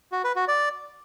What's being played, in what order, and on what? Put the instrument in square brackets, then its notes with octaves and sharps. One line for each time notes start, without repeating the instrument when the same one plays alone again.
[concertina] F#4
B4
F#4
D5